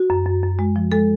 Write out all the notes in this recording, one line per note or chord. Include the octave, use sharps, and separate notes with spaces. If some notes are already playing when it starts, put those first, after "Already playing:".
Already playing: F#4
F#2
F#2
F#2
G#3
F3
G#3 A4